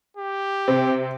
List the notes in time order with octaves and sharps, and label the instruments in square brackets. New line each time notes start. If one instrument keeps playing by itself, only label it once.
[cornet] G4
[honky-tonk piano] C3 C4